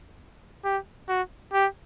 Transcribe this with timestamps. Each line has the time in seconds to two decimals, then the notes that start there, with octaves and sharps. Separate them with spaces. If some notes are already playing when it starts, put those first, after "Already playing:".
0.65 G4
1.09 F#4
1.53 G4